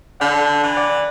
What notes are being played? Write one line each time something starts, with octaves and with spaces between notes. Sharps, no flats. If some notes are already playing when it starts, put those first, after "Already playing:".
D3 D5 F#5
E3
D5 F#5